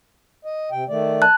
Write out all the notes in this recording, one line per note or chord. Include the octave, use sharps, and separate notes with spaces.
D#5
C3 G5
D#3 A3 D5
A5 F#6